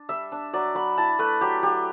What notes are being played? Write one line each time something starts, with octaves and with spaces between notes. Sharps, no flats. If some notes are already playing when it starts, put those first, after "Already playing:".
Already playing: D4
G3 E5
D4
F#3 D5
F#3 B5
E4 A5
A3 B4
F#3 G4
F#3 G4